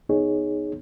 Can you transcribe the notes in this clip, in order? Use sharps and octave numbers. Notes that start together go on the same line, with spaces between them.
C#2 B3 D#4 G#4 C#5